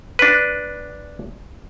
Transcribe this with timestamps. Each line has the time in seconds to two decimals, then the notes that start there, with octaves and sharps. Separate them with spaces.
0.19 D4 B4